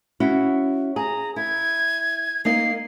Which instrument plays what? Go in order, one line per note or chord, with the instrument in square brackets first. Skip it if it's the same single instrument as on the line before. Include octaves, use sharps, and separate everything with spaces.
[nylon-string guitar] C#4 E4 F#4
[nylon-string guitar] G#4 [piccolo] A#5
[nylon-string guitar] E4 [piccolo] G#6
[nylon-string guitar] A#3 D#4 D#5 [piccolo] C7